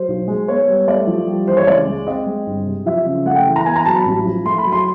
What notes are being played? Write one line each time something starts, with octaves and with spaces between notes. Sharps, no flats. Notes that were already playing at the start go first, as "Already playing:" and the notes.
Already playing: F#3 C5
B1
G#3
B3 C#5
G3
A3 D5
F3
G3
E3 C5
C#5
C#2 D5
G#3
C4 D#5
G#3
G1
C3
F3 E5
C#3
A3 F#5
G5
E3
A#5
B3 G#5
A#5
F#3 A5
B5
A1
F3
A3 C6
B5
F#3
C6